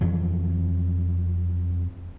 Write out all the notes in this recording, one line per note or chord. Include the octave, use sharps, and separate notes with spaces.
F2 E3 F#3